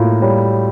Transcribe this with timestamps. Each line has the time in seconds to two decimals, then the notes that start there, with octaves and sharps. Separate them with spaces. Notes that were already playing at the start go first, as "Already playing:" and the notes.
Already playing: A2 A#3 F4 F#4
0.22 G3 C#5